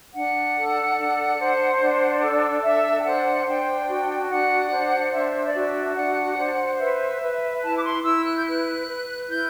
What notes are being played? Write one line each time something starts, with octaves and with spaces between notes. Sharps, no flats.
D4 F#5
A4
D4
C5
D4
A4
D4 E5
G5
C5 F#5
D4 G5
F#4
D4 F#5
C5
D4 E5
D5
F#4 E5
D4 F#5
C5
B4 E5
B4
E4 A5
D6
C6
E4 E6
F#6
G6
B4 F#6
B4
E4 G6